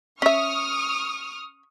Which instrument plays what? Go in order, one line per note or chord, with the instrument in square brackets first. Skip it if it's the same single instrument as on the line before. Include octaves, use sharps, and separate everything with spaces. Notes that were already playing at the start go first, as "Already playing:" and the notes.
[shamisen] C#4 E5 [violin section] C#6 D#6 F6